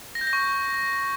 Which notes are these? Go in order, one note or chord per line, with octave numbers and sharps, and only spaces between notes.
A#6
G6
A#6
C#6